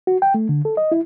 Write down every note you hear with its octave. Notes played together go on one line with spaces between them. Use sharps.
F#4
G5
A3
D3
A4
D#5
E4